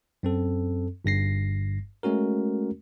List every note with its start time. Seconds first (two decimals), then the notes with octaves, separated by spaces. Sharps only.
0.23 F#2 C4 A4
1.05 G1 G2 A#6 C7
2.03 G#3 A3 C#4 F#4 A#4